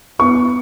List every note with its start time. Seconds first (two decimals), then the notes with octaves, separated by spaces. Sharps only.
0.19 B3 C#6